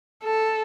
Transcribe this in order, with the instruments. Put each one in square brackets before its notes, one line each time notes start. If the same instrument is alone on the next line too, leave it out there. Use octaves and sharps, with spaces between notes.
[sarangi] A4